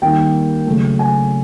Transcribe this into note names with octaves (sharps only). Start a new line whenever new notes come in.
D#3 G3 A#3 G5
C#3 F#3 A3
G#5